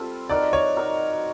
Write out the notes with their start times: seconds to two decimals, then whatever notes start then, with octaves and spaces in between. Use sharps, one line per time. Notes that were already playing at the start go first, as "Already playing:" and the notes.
Already playing: G3 C4 F4 A4
0.29 D#4 F#4 A#4 D5
0.53 C#5
0.77 D#4 F#4 A#4